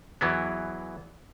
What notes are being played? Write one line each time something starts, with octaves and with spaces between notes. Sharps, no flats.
E2 E3 F#3 B3